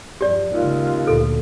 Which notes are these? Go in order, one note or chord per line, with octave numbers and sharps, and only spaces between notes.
F#2 F3 G4 D5
D#2 G#2 C#3 F4
D2 A#2 D3 A4